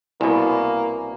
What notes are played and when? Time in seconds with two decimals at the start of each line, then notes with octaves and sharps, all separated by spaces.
0.21 C2 B2 A#3 E4 G#5